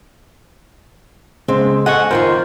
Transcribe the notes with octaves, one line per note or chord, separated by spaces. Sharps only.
C#3 G#3 C4
A4 D#5 F#5 G#5 C#6
F2 D#3 F4 A#4 C5